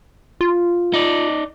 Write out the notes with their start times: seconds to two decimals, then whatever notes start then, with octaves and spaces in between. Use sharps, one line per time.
0.41 F4
0.94 D#4 D5